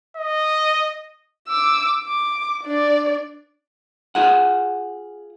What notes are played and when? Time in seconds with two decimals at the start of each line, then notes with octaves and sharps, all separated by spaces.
0.16 D#5
1.49 D6 E6
2.04 D6
2.63 D4 D5
4.15 F4 G#4 F#5